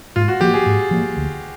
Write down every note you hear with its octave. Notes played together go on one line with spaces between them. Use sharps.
G#2 F4
F#4
F3 A#3 G4
G#4
G#2
F3 A#3
D2